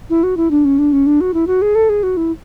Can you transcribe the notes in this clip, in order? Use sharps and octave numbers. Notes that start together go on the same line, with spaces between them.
E4
F#4
E4
D4
C#4
D4
C#4
D4
F#4
E4
F#4
G#4
A4
G#4
F#4
E4